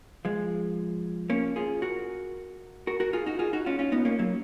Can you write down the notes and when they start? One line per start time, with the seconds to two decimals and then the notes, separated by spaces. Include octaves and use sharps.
0.25 F3 G#3
1.30 A#3 C#4
1.56 F4 G#4
1.82 F#4 A#4
2.87 F#4 A#4
3.00 F#4 A#4
3.13 F4 G#4
3.26 D#4 F#4
3.39 F4 G#4
3.53 D#4 F#4
3.66 C#4 F4
3.79 C#4 F4
3.92 B3 D#4
4.05 A#3 C#4
4.19 F#3 A#3